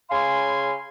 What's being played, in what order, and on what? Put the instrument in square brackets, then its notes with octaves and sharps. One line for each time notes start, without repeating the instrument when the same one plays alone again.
[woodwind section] C#3 F5 G#5 C6